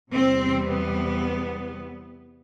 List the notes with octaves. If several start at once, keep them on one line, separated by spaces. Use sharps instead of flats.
E2 C3 G3 C4
B3